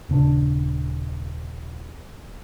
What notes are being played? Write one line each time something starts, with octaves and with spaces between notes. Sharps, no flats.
D#1 C#3 D4